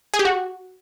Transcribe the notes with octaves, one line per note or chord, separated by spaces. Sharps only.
G#4
G4
F#4